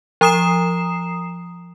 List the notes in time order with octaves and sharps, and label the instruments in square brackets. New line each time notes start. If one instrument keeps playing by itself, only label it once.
[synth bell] F3 A#5 D#6 C7 E7